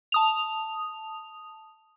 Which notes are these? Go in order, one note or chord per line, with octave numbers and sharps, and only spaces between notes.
A5 D#6 F7